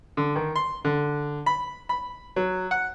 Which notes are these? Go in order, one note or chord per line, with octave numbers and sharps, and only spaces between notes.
D3
D#3
C6
D3
B5
B5
F#3
F#5